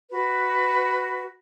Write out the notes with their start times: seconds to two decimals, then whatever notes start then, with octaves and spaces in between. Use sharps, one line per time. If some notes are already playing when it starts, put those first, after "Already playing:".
0.10 F#4 B4